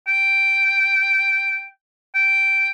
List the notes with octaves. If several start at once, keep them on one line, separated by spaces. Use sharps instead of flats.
G5
G5